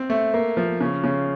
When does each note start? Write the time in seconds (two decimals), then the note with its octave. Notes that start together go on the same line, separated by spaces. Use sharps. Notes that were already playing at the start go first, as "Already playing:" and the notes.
Already playing: C4
0.10 A3
0.34 A#3
0.57 F3
0.81 C#3
1.04 C#3